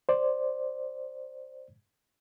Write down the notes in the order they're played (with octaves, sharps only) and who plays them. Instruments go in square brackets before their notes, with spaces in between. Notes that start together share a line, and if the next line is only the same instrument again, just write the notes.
[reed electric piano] C5 D5